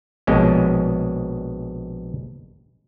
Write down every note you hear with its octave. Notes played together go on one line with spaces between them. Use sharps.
A#1 B2 G#3 C#4